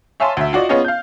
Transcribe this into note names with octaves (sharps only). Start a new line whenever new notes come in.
C#5 E5 F5 G#5 A5 C6
D2 E5
F4 F#4 D5 D#5
B3 C#4 F4 G#4 C#5 D#5
F5 G6